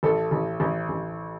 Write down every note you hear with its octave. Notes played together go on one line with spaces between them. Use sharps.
A1 A4
A1
A1
A1